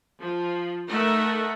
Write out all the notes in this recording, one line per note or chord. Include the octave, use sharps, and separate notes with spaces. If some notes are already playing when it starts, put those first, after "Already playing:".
F3
A3 D#4 A#4 E5 F#5